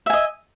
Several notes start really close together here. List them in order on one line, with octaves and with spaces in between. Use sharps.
E5 G#5 D#5